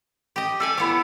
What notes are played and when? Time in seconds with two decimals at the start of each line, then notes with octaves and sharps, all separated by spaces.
0.36 G4 D#5
0.60 A4 D5 E5 G#5
0.78 B3 E4 C#5 D6